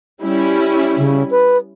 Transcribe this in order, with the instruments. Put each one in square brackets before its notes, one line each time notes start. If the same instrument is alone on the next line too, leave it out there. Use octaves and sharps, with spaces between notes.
[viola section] G3 C#4 E4
[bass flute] C#3
B4